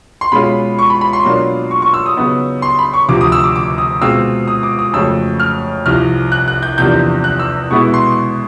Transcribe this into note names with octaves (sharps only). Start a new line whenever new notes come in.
C6
B2 G#3 C#4 F4 B5
C#6
B5
B5
C6
B2 F#3 A#3 D4 F4
C#6
C#6
E6
D#6
C#3 F#3 B3 D#4
C6
B5
C#6
D2 C3 F3 D6
D#6
E6
D6
D6
D#6
B2 G#3 C4 F4 E6
D#6
D6
D#6
F2 C#3 F#3 A3 C#4 E6
F6
C2 C3 F3 F6
F#6
F#6
G6
E2 C3 F3 A#3 D4 G6
F#6
E6
B2 G#3 B3 E4 C#6
C6